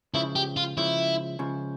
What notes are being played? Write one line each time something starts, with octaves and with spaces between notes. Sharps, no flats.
C#2 C#3 F3 E4
G4
F4
C#2 C#3 F3 E4
C#2 C#3 F3